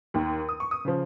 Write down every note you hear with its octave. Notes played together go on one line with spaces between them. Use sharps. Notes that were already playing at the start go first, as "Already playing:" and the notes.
D#2 D#3
D#6
C#6
D#6
C#3 F3